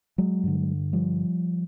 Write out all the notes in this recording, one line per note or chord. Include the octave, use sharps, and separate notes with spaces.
F#3 G#3
G2 D3
F3 G3